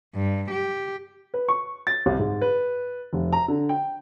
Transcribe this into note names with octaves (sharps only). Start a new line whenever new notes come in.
G2
G4
B4
C#6
A6
C2
G#2
B4
F1
A#5
D3
G5